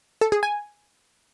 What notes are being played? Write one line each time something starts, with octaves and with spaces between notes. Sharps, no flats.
A4
G#4
G#5